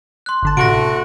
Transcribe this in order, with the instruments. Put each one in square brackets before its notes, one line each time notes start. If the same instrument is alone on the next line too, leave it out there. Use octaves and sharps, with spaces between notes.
[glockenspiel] C6 F#6
[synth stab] G1 D3 A5
[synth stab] A1 C3 [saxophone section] D2 A3 F#4 [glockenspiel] A#6 D7